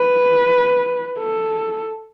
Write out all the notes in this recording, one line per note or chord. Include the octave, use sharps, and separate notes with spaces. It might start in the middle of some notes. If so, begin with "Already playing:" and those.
Already playing: B4
A4